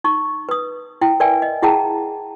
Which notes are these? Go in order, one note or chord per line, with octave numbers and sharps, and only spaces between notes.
D#4 C#6
B4 D#6
E4 G5
A#4 B4 D5 E5 G5 G#5
D#5
E4 G#4 F#5 G5 A5 A#5